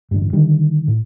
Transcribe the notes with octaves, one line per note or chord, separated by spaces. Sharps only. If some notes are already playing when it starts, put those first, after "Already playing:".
A1 D2 G2
D3 D#3 G3
A2